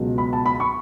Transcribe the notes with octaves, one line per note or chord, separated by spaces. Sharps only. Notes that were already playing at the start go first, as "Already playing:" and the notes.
Already playing: C#2 B2 F#3
B5
A5
B5
C#6